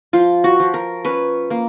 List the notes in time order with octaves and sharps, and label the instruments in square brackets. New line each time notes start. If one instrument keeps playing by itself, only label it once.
[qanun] F3 F4
F#4
F3
A#4
C#4 B4
A#3